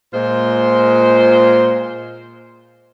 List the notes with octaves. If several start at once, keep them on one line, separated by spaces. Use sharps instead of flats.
A#2 G#3 F4 C5